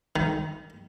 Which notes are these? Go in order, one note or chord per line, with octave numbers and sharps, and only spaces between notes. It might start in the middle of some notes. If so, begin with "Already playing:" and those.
D#3